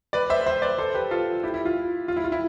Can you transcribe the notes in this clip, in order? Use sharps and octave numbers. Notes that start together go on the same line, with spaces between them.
B4 D5
C5 E5
C5 E5
B4 D5
A4 C5
G4 B4
F4 A4
E4 G4
E4
F4
F4
E4
F4
E4